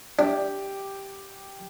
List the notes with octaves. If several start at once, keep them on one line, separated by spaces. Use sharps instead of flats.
D4 G4